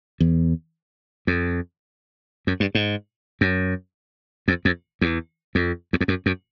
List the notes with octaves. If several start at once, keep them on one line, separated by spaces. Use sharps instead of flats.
E2
F2
F#2
G2
G#2
F#2
F2
F2
E2
F2
E2
F2
F#2
F#2